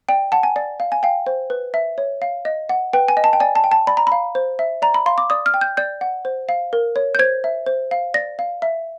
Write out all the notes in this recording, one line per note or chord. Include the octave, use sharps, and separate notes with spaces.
D5 G5
F#5 A5
G#5
D5
F5
G#5
F5 G5
C5
B4
E5
C#5
F5
D#5
F#5
B4 G5
G#5
D#5
A5
G5
D5 G#5
A5
G5
A5
D5 B5
A#5
F5 B5
C5
E5
D5 A#5
B5
F5 C6
D6
D5 D#6
F6
G5
G6
D5 G6
F#5
C5
F5
A#4
C#5
G6
C5 G#6
E5
C5
F5
D5 A#6
F5
E5